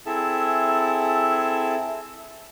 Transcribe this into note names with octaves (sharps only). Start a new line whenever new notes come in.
C4 E4 G#4 A4 E5 A5